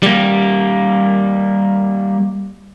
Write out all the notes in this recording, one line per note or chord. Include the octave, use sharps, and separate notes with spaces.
G3 A#3